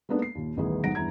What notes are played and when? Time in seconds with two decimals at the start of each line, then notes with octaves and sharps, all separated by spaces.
0.09 G#3 A#3 B3 D4 D#4 A4
0.22 C7
0.35 D#2 A#2
0.57 D#1 A1 D#3 B3 E4 G#4
0.84 B1 G#2 D#4 F#5 A#6 D7
0.95 E2 G2 E4 A#5 G#6